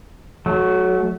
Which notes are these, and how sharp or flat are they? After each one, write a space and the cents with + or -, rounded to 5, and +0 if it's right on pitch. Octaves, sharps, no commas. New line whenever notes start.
F#3 +0 A3 -35